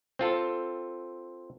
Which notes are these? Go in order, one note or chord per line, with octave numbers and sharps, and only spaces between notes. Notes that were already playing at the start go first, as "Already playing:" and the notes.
C4 F4 A4